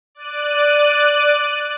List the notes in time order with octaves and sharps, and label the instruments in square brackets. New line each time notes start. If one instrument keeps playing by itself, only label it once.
[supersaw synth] D5 F#6 D#7